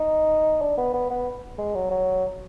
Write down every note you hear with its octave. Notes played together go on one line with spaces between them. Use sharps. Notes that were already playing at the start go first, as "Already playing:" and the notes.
Already playing: D#4
D4
B3
B3
B3
G#3
F#3
F#3